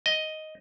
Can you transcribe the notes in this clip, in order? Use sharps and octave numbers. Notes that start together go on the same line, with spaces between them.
D#5